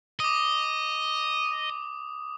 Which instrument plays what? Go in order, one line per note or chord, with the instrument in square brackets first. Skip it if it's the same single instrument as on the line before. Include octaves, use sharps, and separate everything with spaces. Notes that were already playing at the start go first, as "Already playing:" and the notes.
[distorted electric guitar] D#5 [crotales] D6 D#6